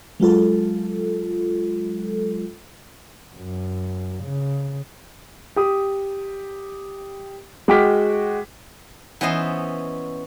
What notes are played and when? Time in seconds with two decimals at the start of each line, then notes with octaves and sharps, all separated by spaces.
0.20 F#3 G#3 F4 A4
3.36 F#2
4.23 C#3
5.56 G4 D#6
7.68 G#3 F#4 G5 D6 F6 B6
9.21 E3 B3 C#4 C5 D#5 C6